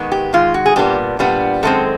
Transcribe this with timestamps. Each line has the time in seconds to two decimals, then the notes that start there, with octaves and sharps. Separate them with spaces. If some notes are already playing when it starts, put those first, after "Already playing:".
Already playing: G#2 D#3 G#3 B3
0.12 G4
0.33 G#2 D#3 G#3 F4
0.54 F#4
0.66 G#4
0.76 A#2 G3 B3 D4 G4
1.19 A#2 G3 B3 D4
1.63 F#2 D#3 G#3 C4 A4